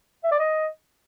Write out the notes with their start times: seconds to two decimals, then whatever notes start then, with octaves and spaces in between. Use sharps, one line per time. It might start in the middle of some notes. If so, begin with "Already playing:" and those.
0.24 E5
0.31 D5
0.39 D#5